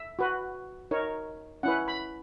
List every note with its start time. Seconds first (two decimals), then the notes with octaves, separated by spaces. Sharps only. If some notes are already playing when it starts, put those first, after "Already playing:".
Already playing: E5
0.19 F#4 B4
0.91 D#4 A#4 C#5
1.63 C#4 E4 B4 F#5
1.88 B5